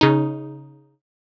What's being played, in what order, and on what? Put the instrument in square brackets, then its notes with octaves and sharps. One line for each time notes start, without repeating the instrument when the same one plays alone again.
[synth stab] C#3 D#4